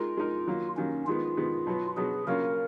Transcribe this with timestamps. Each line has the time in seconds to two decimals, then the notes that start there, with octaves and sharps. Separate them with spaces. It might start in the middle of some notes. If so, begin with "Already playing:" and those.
Already playing: G#3 D#4 F4 A#4
0.17 G#3 D#4 A#4
0.47 D#3 F#3 A#3
0.77 D#3 F#3 A#3 C#4
1.07 D#3 G#3 B3 F4
1.37 D#3 G#3 B3
1.67 B2 F#3 B3
1.97 B2 F#3 B3 G#4
2.27 C#3 F#3 A#3 C#4 F4 A#4